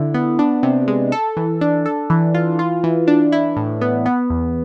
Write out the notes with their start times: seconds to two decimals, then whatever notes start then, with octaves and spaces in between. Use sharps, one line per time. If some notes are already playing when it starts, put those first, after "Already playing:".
Already playing: D3 E4
0.14 B3
0.39 D4
0.63 C3
0.88 G#3
1.12 A4
1.37 E3
1.61 D4
1.86 A4
2.10 E3
2.34 F4
2.59 F4
2.84 E3
3.08 D4
3.32 E4
3.57 A2
3.81 B3
4.06 B3
4.30 E2